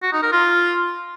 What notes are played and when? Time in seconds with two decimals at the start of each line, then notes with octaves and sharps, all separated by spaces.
0.02 F#4
0.12 D#4
0.22 A#4
0.32 F4